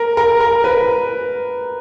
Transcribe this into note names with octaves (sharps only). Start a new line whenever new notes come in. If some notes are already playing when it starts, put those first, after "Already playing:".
Already playing: A#4
A#4
A#4
B4